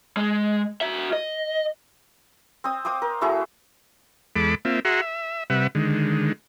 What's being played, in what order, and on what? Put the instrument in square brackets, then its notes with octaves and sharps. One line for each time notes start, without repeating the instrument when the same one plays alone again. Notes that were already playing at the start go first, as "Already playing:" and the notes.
[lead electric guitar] G#3
F#4 E5
D#5
[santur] C4 D#6
C5 F5 D6 D#6
A#4
A3 E4 F#4 G#4
[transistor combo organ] E2 G#3 A4 B5 D6
A#3 C4 F4 E5
F#4 G#4 E5 F#5 A#5 C6
E5
C3 G3 B4 E5 F#5
D3 D#3 G#3